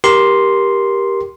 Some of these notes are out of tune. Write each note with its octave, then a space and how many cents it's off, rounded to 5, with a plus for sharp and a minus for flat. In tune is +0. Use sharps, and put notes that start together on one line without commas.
G4 +0 A#4 +15 C6 +0